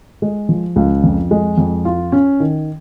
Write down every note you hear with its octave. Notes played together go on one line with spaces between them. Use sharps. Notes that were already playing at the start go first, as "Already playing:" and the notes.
G#3
F3
C#2
F2
G#3
F2
F4
C#4
D#3